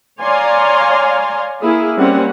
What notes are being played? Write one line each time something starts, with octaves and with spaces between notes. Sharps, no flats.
C#5 D5 F5 G#5 A#5 C6
A#3 E4 G#4
G3 A#3 C4 C#4 F#5